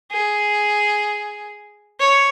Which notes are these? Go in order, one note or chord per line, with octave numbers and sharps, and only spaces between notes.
G#4
C#5